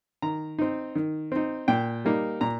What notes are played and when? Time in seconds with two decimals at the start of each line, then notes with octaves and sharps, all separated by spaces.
0.22 D#3 A#5
0.59 C4 D#4
0.95 D#3
1.32 C4 D#4
1.68 A#2 G5
2.05 G3 A#3 D#4
2.41 A#2 A#5